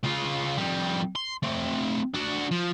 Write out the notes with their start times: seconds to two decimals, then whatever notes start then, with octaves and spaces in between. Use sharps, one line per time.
0.03 C#3 F4
0.57 F2 G3
1.15 C6
1.43 A3 C4
2.14 D4 F#4
2.51 F3